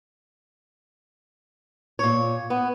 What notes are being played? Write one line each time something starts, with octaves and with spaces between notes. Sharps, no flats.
A#2 C#5
B3